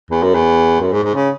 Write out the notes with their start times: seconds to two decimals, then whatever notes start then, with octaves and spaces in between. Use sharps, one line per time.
0.10 E2
0.22 F#2
0.34 E2
0.80 F#2
0.92 G#2
1.03 G#2
1.14 C#3